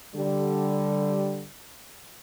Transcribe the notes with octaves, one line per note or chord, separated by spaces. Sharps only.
D3 G3